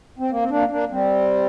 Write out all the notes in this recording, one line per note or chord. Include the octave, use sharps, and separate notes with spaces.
C4
A#3
C4
A#3 D4
A#3 D4
G3 C4